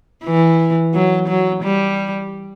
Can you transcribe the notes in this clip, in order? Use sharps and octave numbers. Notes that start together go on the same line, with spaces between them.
E3
F#3
F#3
G3